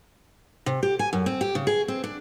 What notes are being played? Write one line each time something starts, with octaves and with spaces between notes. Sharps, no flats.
C3
G4
G#5
F#2
C4
G4
C#3
G#4
C4
D4